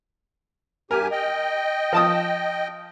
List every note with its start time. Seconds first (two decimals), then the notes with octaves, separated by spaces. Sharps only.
0.91 G2 G4 A#4 G#5
1.12 D#5 G5
1.93 F3 A5 D#6